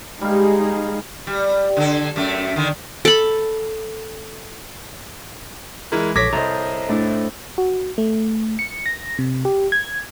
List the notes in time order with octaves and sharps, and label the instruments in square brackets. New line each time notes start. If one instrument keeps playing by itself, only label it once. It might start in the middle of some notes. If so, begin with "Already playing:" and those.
[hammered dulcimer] G3 F5 [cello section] G#3 D#4 G#4
[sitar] G3
D3 A4
F#2 A3
D3 D#3
[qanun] A4 B5
[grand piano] E3 G#3 [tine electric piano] A#4
[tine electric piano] A#1 B6 [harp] A4 C#5 [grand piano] D6 G#6 A#6
[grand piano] C2 [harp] A4 C5 D#5 [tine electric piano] A#5
[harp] A2 D4 E4
[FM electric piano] F#4
A3
C#7
A#6
C3
G4
G#6